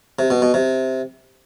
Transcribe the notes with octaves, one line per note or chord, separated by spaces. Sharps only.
C3
B2
B2
C3